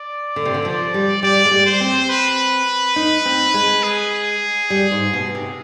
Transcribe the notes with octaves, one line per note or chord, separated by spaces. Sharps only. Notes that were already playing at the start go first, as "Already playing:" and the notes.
Already playing: D5
D3
C3
D3
F3
G3
G3 D5
G#3
G3
C5
C4
B4
D#4
C4
G#3
G#4
G3
G#2
B2
C3